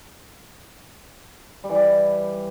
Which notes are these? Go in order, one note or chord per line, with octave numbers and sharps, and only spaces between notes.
G3
E3
G3
E3